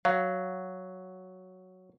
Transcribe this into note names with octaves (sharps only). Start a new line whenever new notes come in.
F#3 F5